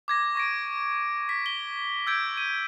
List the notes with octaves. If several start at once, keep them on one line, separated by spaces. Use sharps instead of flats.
D6 G#6 A#6
C#6 A#6 D7
B6
G7
E6 G6 G#6 D7
D#7